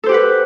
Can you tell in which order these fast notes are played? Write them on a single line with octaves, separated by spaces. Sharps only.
A4 C5 G4 F#5 B4